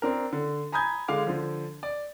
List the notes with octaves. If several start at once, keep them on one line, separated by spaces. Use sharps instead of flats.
C4 D4 A#4
D3
G#5 A#5 B5 D#6 G6 G#6
D3 G#3 F5 D6
D3 F3
D5